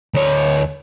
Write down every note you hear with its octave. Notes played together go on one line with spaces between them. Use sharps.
D2 C#5